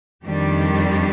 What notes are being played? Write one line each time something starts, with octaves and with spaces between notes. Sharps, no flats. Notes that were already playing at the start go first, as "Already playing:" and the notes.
F2 D#3 G3 D4 G4